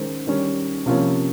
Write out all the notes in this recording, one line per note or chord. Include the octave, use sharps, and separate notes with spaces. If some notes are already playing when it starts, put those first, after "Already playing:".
Already playing: D#3 G#3 C#4 C5
D#3 G3 C#4
C3 F3 A#3 C#4